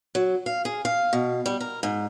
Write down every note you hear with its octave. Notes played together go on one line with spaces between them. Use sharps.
F#3
F5
G#4
F5
B2
G3
A#4
G#2